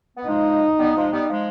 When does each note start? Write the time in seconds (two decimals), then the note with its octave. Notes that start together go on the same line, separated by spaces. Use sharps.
0.17 B3
0.27 F3 G#3 D#4
0.79 G3 B3
0.96 F3 G#3
1.12 G3 B3
1.29 F3 G#3